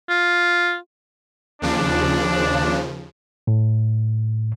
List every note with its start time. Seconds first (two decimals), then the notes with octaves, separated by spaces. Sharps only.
0.09 F4
1.62 D#2 C#3 F3 D4
3.47 A2